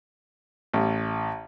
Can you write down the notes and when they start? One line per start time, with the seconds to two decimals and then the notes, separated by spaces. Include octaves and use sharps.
0.74 A1